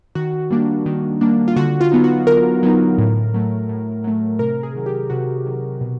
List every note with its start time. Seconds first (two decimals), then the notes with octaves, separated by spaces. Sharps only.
0.15 D#3 F#4
0.51 G3 A#3 D4
0.86 D#3
1.21 G3 A#3 D4
1.48 F4
1.56 D3 F#4
1.81 F4
1.91 F#3 B3 D#4
2.04 F#4
2.27 D3 A#4
2.63 F#3 B3 D#4
2.98 A2
3.34 F#3 A3
3.69 A2
4.04 F#3 A3
4.39 C3 A#4
4.63 G#4
4.75 D#3 F#3
4.86 G4
5.10 C3 F#4
5.46 D#3 F#3
5.81 B2